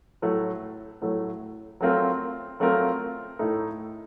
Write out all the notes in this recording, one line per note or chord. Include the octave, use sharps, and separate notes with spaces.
A2 F#3 A3
A2 F#3 A3
F#3 A3 C4 F4 A#4
F#3 A3 C4 F4 A#4
A2 A3 D#4